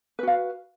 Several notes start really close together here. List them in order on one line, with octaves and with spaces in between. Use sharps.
B4 F#4 F5